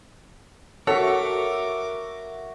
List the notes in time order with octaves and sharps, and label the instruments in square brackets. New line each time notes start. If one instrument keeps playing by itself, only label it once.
[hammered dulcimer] F#4 E5 [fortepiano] A4 [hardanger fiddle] A#4 D6 [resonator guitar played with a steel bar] C#5